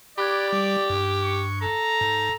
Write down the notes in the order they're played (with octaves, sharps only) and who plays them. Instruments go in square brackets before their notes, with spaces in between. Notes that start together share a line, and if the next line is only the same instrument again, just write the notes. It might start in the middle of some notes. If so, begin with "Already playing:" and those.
[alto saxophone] G4 [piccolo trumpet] D5 [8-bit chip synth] B5 F#6 G#6
[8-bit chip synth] G3
G2
[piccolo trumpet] C#6
[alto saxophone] A4 [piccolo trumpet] A#5
[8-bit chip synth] G#2